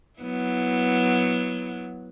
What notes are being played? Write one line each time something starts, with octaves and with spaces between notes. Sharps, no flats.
F#3 B3 E4